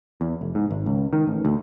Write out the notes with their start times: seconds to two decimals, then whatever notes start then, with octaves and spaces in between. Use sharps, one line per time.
0.21 E2
0.41 F1
0.55 G#2
0.71 G#1
0.86 C#2
1.13 D#3
1.27 A1
1.45 D2